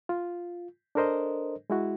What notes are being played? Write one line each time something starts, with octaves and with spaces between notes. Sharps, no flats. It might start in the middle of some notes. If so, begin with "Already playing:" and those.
F4
D4 A4 A#4 C5 D#5
G#3 E4 F#4